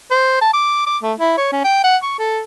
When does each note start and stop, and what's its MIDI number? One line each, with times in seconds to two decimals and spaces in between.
0.11 0.41 72
0.41 0.51 81
0.54 0.84 86
0.86 0.98 86
1.03 1.13 57
1.20 1.34 64
1.38 1.48 73
1.52 1.62 61
1.64 1.82 79
1.84 1.97 78
2.03 2.16 85
2.19 2.41 69